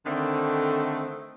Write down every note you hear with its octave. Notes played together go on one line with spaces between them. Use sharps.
D3 D#3 A3 C4